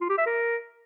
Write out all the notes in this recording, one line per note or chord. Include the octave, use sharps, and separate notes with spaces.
F4
G4
E5
A#4